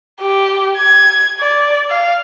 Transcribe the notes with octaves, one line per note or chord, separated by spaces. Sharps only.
G4
G#6
D5
F5